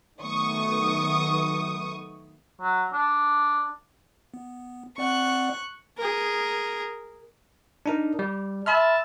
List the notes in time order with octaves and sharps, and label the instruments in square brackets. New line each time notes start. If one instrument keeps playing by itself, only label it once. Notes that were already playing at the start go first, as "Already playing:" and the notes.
[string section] D#3 F#3 A3 B3 C#6 D#6
[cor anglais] F#3
D4
[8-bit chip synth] B3
[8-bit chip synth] C4 D5 F#5 [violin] C#6 F#6
[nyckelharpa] G#4 A#4
[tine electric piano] D4 D#4 A#4
G3
[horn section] E5 A5 [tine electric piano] B5 C6 F6